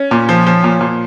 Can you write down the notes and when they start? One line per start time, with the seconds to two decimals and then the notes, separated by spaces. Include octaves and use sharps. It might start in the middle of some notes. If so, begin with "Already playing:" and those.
Already playing: C#4
0.11 A#2
0.29 F3
0.46 F3
0.64 A#2
0.81 A#2